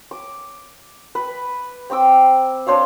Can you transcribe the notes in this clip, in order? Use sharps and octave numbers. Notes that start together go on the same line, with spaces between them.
D6
B4
C4 G5 D6 E6
D4 C5 C#5 F5